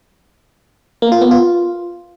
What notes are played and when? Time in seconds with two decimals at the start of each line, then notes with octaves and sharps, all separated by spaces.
1.02 A#3
1.12 F4
1.21 B3
1.31 F4